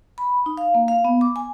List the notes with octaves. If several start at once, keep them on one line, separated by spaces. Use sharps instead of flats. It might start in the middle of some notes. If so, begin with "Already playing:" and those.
B5
D#4
F5
A#3
F5
B3
D6
G#5